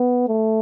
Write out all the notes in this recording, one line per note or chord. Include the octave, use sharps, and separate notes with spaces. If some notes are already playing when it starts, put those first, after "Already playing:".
Already playing: B3
A3